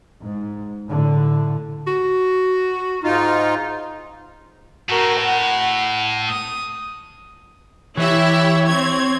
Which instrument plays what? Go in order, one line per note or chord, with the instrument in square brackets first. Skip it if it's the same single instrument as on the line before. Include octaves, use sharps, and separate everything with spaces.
[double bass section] G#2
A2 D3
[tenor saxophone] F#4
[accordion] G#2 D#4 F4
[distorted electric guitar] A2 [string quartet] F#4 A#4
[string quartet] F#5
D#6
[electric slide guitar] E3 [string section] E4 G4 E5 [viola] C#5
[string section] C4 G#6